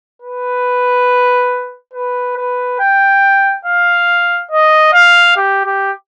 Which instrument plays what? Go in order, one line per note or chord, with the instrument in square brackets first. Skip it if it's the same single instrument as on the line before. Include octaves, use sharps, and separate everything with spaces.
[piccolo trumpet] B4
B4
B4
G5
F5
D#5
F5
G4
G4